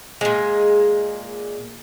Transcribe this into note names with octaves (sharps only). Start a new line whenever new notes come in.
A#2 G#3